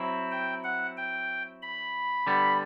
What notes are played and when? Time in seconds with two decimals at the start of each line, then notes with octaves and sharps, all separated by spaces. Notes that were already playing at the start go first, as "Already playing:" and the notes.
Already playing: F#3 C4 E4
0.31 G5
0.64 F#5
0.97 G5
1.62 B5
2.27 D3 G3 B3